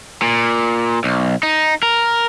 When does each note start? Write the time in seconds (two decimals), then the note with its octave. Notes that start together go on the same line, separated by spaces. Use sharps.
0.22 A#2
1.04 B1
1.43 D#4
1.83 A#4